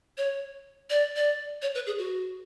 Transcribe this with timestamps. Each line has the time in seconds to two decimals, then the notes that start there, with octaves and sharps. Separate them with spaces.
0.18 C#5
0.90 D5
1.16 D5
1.62 C#5
1.75 B4
1.87 G#4
1.99 F#4